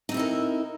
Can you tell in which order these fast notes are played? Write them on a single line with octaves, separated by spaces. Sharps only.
D#4 C4 E4 A4 A#4